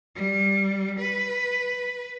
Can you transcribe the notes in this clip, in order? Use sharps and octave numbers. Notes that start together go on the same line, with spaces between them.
G3
B4